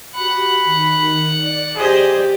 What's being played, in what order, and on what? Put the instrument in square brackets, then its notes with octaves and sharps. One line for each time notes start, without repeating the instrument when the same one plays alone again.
[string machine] F#4 G4 [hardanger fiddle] F#5 [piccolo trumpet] B5
[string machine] D#3
D5
[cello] G4 [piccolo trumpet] G#4 [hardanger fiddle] C5 D#5